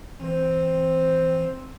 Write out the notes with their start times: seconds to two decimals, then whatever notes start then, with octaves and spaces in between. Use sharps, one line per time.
0.20 E3 C4 C5